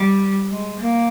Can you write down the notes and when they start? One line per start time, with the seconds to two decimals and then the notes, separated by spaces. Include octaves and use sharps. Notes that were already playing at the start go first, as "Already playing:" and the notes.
Already playing: G3
0.51 G#3
0.80 A#3